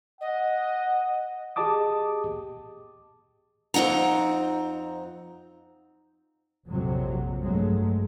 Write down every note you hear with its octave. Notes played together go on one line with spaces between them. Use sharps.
D#5 F#5
G4 G#4 D#5 A5 D6 D#6
F2 C4 D#4 F#5 A#5
A#1 F2 C3 F#3
G2 F#3 G#3 A3